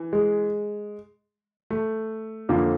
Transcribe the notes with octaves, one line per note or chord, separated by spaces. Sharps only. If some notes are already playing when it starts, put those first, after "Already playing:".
Already playing: E3
G#3
A3
F2 D3 F3 A#3